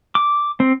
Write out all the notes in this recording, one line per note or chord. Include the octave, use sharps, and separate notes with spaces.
D6
C4